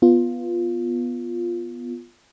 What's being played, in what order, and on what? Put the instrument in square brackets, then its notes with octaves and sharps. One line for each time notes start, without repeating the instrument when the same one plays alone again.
[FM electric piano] B3 F4